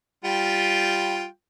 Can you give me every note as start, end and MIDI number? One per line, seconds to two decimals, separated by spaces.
0.24 1.25 55
0.24 1.25 65
0.24 1.25 79